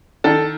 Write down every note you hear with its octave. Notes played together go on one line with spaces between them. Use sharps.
D#3 A4